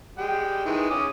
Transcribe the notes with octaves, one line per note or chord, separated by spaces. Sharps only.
G3 G#3 G5
D#3 E3 G#3
C#4 D6 D#6